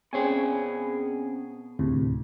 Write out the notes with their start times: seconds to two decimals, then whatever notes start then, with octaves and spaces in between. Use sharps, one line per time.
0.13 B2 C4 C#4 G#4 G#5
1.79 D2 A2 C3